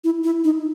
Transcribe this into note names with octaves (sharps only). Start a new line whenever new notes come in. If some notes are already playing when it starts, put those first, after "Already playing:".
E4
E4
D#4